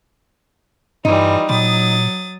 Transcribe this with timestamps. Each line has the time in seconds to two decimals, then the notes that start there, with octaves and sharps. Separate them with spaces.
1.05 G2 E3 G3 D#4 F4
1.49 A#2 F#3 D#6 A6